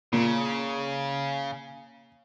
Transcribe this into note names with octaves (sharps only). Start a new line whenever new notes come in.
A#2 C#3